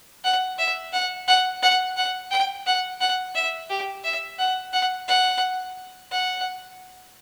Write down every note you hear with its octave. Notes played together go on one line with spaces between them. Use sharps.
F#5
E5
F#5
F#5
F#5
F#5
G5
F#5
F#5
E5
G4
E5
F#5
F#5
F#5
F#5